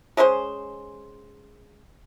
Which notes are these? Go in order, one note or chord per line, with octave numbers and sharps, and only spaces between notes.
G#3 C#4 G#4 C5